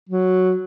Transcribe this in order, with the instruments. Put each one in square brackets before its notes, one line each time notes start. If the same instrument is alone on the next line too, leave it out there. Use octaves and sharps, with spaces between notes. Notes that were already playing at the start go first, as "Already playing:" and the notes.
[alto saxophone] F#3